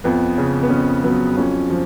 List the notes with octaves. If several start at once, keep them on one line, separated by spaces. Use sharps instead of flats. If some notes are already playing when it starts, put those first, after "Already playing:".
F2 B3
C#3 C#4
B3
F2 C#4
F#3 B3
F2 C#4
F3